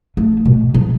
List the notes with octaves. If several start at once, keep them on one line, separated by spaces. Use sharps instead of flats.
A3
B2
F3